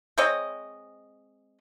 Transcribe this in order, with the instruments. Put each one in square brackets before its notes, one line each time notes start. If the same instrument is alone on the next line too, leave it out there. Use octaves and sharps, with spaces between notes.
[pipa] G#3 C4 C#5 D#5